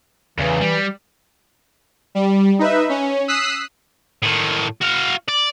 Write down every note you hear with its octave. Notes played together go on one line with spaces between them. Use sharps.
E2 C#3 E3
G3
G3
D#4 B4 E5
C#4
D#6 E6 F#6 B6 C7
A2 D#3
F#4 F5
D5